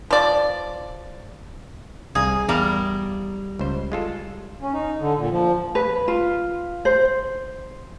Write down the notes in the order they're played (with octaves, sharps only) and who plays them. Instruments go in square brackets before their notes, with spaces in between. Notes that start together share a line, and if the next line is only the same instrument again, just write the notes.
[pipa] F3 D5
[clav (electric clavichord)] C2 F5 A#5 [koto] G#4
[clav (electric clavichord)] E2 E4 F5 [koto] G3 A#4
[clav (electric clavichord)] C#2 C5
G#3 F4 A4
[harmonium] C#4
D#4
D3
A#2
F3
[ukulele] B4
F4
C5